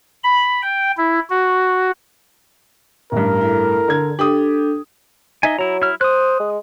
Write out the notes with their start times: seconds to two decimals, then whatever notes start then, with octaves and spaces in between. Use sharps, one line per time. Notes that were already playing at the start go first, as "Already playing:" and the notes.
0.24 B5
0.63 G5
0.97 E4
1.30 F#4
3.12 A1 G2 A#4
3.41 E4 A4
3.88 D3 G#6
4.19 D4 G4 A4 D#6
5.43 D#4 D#5 E5 G#5
5.59 F#3 E4 A#5
5.82 E4 F6
6.01 C5 D#6 F#6
6.40 G#3